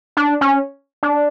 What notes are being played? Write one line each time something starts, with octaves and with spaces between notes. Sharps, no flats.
D4
C#4
D4